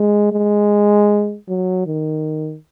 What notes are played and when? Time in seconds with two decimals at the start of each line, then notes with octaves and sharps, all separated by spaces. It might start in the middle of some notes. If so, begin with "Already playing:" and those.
Already playing: G#3
0.32 G#3
1.49 F#3
1.86 D#3